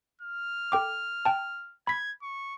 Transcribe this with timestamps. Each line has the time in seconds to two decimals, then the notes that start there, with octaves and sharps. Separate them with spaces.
0.21 F6
0.72 A4 G5 D6
1.25 G5 A5
1.87 B5 G#6 B6
2.22 C#6